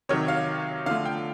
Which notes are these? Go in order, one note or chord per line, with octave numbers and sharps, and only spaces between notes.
C3 D#3 F#3 C#5
F5
D3 F3 A3 F5
G5